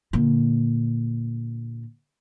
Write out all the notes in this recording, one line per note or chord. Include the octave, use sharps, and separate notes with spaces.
A#2 D3